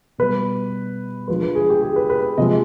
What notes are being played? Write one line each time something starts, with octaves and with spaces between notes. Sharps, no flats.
B2 G3 B4
D3 F3 G#3 B4
B4
G#4
G4
G#4
B4
B4
C3 F3 G#3 D#5